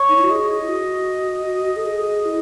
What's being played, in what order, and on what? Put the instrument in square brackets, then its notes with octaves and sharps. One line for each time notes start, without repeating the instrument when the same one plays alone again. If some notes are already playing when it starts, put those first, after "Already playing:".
Already playing: [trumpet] C#5
[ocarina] D#4
E4
F#4
[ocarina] G#4 [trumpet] D#5
[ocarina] E4
F#4
A4
G#4
E4